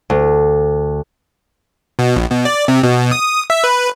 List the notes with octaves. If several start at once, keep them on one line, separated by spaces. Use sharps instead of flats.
D2
B2
A#1
B2
D5
C3
B2
D#6
E5
B4